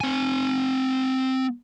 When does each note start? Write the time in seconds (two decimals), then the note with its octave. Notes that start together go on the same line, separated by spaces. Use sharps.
0.01 C4 G#5